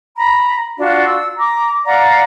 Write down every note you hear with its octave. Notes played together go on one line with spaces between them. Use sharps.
A#5 B5
D4 F4 F#4 F5
E6
A#5 D6
D5 F5 F#5 A#5